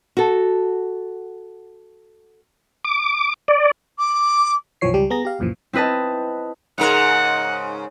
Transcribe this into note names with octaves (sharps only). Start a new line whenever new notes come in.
F#4 A4
D6
D5
D6
B1 F#2 E3 F3 C#5 C7
C#2 G3 G4
B3 G#4 A#5 A#6
G4 F5
C#2 F#2 A#2 E3 F3
C4 E4 B4 D#5 A5
G#2 C#3 A#4 F#5